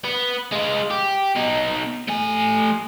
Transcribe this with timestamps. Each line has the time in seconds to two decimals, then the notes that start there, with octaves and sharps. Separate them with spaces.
0.05 B3
0.52 G#3 F4
0.91 G4
1.36 B2 D#4
2.08 A3 G#5